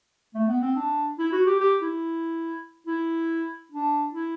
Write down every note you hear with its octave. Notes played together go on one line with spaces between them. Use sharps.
A3
B3
C4
D4
E4
F#4
G4
G4
E4
E4
D4
E4